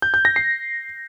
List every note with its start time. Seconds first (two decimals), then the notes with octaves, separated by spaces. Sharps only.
0.02 G6
0.14 G6
0.25 A#6
0.36 C7